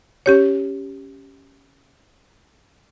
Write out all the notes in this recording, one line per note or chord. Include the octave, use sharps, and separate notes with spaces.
C#4 G4 C#5